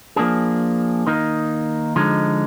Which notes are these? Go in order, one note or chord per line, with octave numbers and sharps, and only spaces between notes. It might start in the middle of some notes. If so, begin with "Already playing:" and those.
F3 A#3 D4 G#4
D#3 A#3 D#4
D3 F3 G#3 D#4